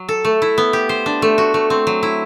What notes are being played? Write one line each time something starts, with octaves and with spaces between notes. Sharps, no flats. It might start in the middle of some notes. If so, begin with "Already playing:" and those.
Already playing: F#3
A4
A3
E4
B3
G4
C5
D4
A3
F#4
A3
C4
F#3
E4